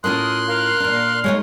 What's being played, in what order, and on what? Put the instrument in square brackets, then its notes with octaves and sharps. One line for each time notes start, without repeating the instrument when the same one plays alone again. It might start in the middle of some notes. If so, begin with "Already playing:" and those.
[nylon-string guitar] A2 C#4 F4 [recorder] A#4 [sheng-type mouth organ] C6 F#6 [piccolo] D#6
[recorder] A#4 [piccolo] F5
[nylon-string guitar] A#2 D4
[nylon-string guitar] G#3 A3 D#4 [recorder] C#5